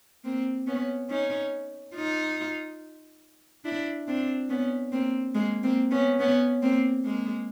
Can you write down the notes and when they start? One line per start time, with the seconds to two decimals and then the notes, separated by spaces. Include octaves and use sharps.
0.24 A#3 C4
0.67 B3 C#4
1.10 C#4 D#4
1.95 D#4 F4
3.65 D4 E4
4.08 C4 D4
4.49 B3 C#4
4.92 A#3 C4
5.35 G#3 A#3
5.63 A#3 C4
5.91 B3 C#4
6.19 B3 C#4
6.62 A#3 C4
7.05 G#3 A#3